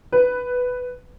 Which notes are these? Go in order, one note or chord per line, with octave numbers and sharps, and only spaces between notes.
B4